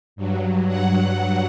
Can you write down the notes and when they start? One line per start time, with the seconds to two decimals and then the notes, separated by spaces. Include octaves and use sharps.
0.16 G2 F#3
0.67 F#5